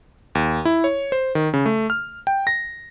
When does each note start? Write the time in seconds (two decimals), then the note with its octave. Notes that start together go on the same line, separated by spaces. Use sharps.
0.35 D#2
0.65 E4
0.84 C#5
1.12 C5
1.35 D#3
1.54 C#3
1.66 A3
1.90 F6
2.27 G5
2.47 A#6